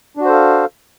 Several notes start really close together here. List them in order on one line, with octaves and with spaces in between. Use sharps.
D4 F#4 C5 A4 F5